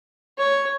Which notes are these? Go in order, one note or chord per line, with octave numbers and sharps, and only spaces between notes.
C#5